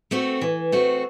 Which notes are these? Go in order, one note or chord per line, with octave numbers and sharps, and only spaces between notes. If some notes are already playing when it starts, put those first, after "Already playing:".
A3 C4 F#4
E3
A3 C4 F#4